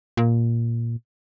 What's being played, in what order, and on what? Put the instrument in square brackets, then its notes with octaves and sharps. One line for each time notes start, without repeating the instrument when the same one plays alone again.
[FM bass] A#2